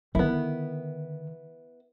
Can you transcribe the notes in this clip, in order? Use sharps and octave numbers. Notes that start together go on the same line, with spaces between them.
D3 D#3 B3 E4